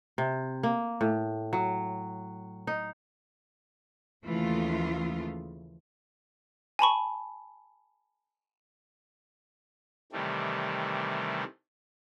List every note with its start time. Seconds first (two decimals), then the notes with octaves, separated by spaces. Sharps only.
0.18 C3
0.63 A#3
1.01 A2
1.53 F#3
2.67 D#4
4.25 D#2 C#3 E3 F3 A3 F4
6.79 G#5 A5 B5 C#6
10.13 C3 D#3 E3 G3 A3